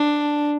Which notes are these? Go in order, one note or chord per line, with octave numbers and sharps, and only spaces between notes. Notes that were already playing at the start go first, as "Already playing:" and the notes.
Already playing: D4